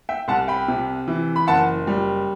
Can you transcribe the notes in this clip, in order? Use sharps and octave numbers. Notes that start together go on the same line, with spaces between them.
E5 G5
C2 F#5 A5
G5 B5
C3
E3
B5
F#1 F#5 A5
G3